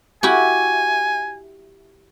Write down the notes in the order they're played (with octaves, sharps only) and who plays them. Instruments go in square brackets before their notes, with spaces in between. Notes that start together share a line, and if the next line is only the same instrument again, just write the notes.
[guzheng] E4 F#4 G4 [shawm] G#5